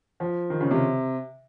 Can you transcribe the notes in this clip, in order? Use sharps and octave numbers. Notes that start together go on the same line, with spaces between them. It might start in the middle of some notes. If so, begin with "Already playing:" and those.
F3
D#3
C#3
C3